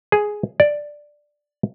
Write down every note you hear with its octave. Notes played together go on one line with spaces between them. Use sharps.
G#4
D5